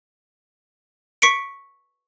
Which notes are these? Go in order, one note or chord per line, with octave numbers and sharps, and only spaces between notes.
C#6 B6 C#7 D7